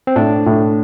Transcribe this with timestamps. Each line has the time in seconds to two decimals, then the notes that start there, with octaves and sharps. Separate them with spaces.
0.07 C4
0.16 A2 D4
0.46 A2